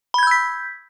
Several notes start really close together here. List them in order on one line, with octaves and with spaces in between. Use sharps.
B5 G#6 G6 E6 B6